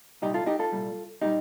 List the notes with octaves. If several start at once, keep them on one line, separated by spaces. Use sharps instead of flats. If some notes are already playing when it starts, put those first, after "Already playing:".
C2 A#2 G3 D#4 G4
F4 A4
D#4 G4
F4 A4
C2 A#2 G3
A#2 G3 D#4 G4